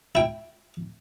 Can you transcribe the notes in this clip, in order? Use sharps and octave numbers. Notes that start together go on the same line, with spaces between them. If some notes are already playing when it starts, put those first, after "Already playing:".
E4 G5